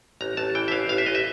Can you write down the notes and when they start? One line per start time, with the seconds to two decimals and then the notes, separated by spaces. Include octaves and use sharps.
0.21 A1 A#5
0.37 A1 A5
0.55 E3 G5
0.68 E5
0.72 A1 F5
0.89 A1 F5
0.98 E5
1.06 A1 D#5
1.15 E5